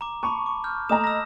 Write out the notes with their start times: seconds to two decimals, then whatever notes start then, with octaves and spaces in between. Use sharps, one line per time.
0.01 A#5 D6
0.23 A5 B5 C#6 D6
0.46 D6
0.64 F6 G6
0.89 A3 D#5 A#5 D#6 E7
1.04 E6 A#6